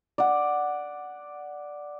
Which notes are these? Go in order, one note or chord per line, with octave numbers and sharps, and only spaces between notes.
D5 F#5